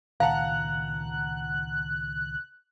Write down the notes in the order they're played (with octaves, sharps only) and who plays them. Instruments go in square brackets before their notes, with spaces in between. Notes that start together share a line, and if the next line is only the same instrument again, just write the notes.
[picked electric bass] C#2 A#2 D#3 [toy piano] F5 [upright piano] F#5 A5 A#5 [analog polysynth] F#6